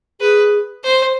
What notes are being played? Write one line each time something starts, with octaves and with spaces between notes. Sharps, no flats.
G#4 B4
C5